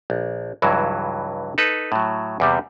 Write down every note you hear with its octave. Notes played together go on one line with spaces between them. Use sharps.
A#1
C#2 G2 E3 F#3
D#4 A4 B4
A2 F#3
E2 C3 G3